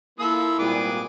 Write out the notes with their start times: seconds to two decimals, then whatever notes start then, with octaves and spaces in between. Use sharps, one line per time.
0.19 F3 A#3 E4 A4 E6
0.59 G#1 A#2 G3 B3 G#4 D6